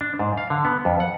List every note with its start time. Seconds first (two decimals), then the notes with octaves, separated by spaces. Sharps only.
0.01 D4
0.19 G#2
0.38 F5
0.50 D3
0.65 B3
0.85 F2
1.00 F#5